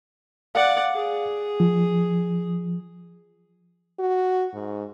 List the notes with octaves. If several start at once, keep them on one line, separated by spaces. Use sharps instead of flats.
D5 F5 F#5
G#4
F3
F#4
G#2